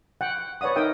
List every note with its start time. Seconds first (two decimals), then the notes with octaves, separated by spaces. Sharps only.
0.21 F#5 G5
0.61 B4 C#5 D5 F#5 D#6
0.76 D#4 A#4 E5 G5 D#6